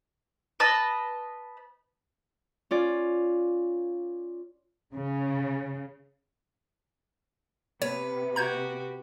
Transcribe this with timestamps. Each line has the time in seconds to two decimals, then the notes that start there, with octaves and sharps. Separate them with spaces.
0.60 B4 D#5 A5
2.71 C#4 F4 D5
4.93 C#3
7.82 C3 B3 B4 C#5
8.36 F#4 G4 A#5 G6 G#6